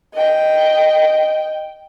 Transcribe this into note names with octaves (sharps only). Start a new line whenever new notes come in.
D#5 G5